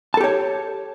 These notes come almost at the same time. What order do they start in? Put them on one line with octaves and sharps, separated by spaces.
A5 A4 G4 C#5